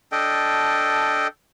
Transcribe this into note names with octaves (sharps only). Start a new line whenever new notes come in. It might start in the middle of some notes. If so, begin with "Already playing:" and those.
D4 A4 D#5 G5